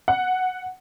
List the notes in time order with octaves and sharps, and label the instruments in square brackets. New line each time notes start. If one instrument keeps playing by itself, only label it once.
[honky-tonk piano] F#5